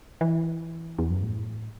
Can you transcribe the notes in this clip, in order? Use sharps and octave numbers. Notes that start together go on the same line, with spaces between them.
E3
E2
F#2
A2